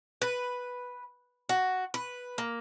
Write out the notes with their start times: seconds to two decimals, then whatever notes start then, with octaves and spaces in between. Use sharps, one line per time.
0.22 B4
1.49 F#4
1.94 B4
2.38 A#3